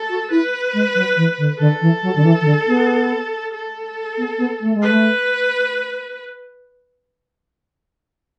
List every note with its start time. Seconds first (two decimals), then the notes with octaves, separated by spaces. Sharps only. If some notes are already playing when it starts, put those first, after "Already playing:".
Already playing: A4
0.09 F#4
0.31 E4 B4
0.73 G#3
0.95 F#3
1.16 E3
1.38 D3
1.59 D3 A4
1.81 E3
2.03 F#3
2.16 D3
2.24 E3
2.41 E3
2.45 D3
2.67 B3
3.53 A4
4.17 B3
4.38 B3
4.61 A3
4.74 G#3
4.82 B4
4.88 A3